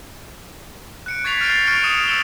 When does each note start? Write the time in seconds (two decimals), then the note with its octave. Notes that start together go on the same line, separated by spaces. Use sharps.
1.06 F#6 C#7 D7
1.24 C#6 G#6 A6 B6 C7 F7
1.41 F6 G6 A6 C7 D7
1.66 C#6 F6 C#7 D7 F7 G7
1.84 D#6 C7 C#7 D#7 E7
2.08 E6 C#7 D7 E7 F#7 G7